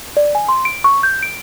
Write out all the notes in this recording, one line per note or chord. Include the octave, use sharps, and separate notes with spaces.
D5
G#5
C6
D7
C#6
G6
D7